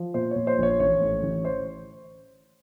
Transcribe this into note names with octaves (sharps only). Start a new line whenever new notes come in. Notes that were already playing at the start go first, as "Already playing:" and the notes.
Already playing: F3
A#2 C5
A#2 C#5
C5
A#1 C#5
A1 C#5
A2
A1
C5